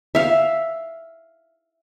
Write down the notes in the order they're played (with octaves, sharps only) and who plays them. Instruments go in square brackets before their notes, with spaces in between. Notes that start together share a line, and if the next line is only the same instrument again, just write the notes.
[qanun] E5 F5